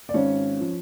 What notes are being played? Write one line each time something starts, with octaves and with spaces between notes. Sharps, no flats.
D5
G#1 C#4 C#5
F3